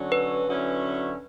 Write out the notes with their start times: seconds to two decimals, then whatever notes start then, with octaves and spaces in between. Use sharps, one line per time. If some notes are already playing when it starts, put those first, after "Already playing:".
Already playing: D3 F#3 C#4 F#4
0.12 B4
0.46 D3 F#3 C#4 E4